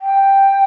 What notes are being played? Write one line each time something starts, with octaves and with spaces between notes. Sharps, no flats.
G5